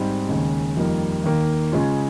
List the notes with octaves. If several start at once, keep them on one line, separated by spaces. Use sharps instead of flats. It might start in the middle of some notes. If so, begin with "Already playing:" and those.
Already playing: G#2 G3 C4
D#2 C#3 G#3
F2 D#3 G3 A#3
D#2 D#3 A#3
C#3 G#3 C#4 F4